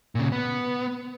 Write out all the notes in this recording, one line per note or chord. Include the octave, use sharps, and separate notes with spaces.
A#2 C#3
B3